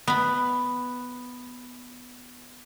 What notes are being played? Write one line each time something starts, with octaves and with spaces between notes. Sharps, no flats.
B3 B5